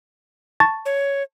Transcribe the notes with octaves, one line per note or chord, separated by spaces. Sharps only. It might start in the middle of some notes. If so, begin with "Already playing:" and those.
A5 C#6 A6
C#5